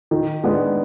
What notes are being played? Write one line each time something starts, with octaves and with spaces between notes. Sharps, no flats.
D#3
G#3 B3 D4